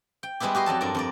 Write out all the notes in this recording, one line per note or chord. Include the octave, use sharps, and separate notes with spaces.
G5
G3 G#3 B3 E4 G4
F#4 G4 D#5 C6
F2 F#3 A4 A5
G2 A#4 D5
F2 A#4 D5